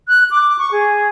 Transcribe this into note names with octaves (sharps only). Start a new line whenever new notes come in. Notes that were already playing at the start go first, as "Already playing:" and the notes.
F#6
D6
C#6
G#4